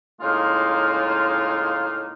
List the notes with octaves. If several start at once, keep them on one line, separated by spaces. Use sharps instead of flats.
A2 C#3 G#3 A#3 D#4 F4